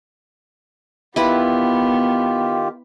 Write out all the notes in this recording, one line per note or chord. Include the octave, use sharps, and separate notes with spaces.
D#3 B3 E4 F4 G4 B4